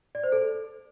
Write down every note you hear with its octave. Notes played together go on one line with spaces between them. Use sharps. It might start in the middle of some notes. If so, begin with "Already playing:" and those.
D5
C5
A4